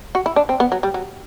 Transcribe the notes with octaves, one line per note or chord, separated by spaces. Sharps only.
F#4
E4
D4
C4
B3
F#3
G3
F#3